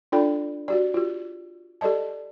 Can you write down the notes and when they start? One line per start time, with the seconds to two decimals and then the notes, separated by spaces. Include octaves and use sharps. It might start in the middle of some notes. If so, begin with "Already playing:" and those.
0.12 D4 F4 A4 D5 G5 B5
0.68 F#4 G4 D5
0.94 F4 G4
1.81 G4 A4 D5 D#5 A5